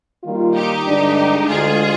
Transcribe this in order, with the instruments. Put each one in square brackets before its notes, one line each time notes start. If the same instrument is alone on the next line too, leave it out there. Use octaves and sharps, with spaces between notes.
[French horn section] D#3 G3 A#3 F4
[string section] D#4 G4
[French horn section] G2 D3 G#3 D4
[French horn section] D2 D3 G#3 [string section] F4 G#4